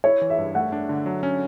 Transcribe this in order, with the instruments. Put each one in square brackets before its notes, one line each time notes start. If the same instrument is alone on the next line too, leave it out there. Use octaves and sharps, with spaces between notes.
[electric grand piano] E4 [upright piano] C#5
[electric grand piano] E3
[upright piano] E5
[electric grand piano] G2
[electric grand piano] A3 [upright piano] F#5
[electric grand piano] D4
D3
F#3
C#4